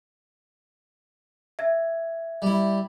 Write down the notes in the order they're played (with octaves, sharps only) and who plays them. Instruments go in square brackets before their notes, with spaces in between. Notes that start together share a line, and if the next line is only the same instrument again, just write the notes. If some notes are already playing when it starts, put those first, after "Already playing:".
[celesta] E5 G#6
[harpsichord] G3 E4